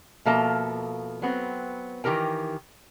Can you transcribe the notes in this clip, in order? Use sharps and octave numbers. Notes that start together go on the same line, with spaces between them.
B2 F3 A#3 A4 E5 A#5
F#3 B3 C4
D#3 E3 G4 A#4 G5